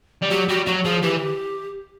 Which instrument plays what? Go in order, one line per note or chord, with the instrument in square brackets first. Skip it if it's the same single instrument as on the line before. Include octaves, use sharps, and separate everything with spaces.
[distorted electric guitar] G3
[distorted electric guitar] F#3 [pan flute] G4
[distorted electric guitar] G3 [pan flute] F#4
[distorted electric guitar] F#3 [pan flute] F#4
[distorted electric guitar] F3 [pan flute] G#4
[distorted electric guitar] E3 [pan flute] G4